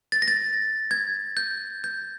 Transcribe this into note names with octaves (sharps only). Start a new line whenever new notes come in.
A6
A#6
A6
G#6
G6
G6